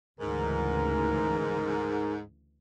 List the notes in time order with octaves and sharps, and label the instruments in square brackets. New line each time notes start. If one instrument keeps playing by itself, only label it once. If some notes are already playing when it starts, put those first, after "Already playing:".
[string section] D2 C#3 E3 [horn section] G#2 [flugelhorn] A#4